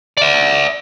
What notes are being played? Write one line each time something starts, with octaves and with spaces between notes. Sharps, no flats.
D5 E5